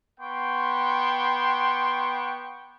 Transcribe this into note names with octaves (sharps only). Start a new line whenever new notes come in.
B3 G5 C6 C#6